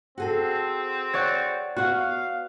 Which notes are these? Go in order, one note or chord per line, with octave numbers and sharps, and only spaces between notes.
C4 F#4 G#4 A4
C#5 D5 F#5
B3 F#4 F5 F#5